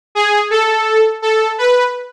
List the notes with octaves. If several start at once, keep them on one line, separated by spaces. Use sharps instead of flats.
G#4
A4
A4
B4